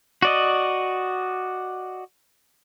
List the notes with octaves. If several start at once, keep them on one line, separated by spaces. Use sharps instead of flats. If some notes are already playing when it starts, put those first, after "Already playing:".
F#4 D5 D#5